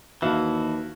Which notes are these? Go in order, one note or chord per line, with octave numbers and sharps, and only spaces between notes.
D#2 E3 E4 F#4 E5 F5 A5